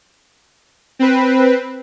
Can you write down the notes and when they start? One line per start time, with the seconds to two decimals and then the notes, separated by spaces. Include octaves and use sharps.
0.99 C4 B4